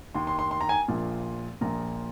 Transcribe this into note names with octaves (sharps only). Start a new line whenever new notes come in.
D#2 D#3 C6
C6
C6
C6
A#5
G#5
A#1 A#2 F3
A#1 A#2 F3 A#5